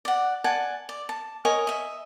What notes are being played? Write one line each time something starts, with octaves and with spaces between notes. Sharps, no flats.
D5 F#5
D5 F#5 G#5 A5
D5
A5
A#4 C#5 D#5 G#5
D#5 E5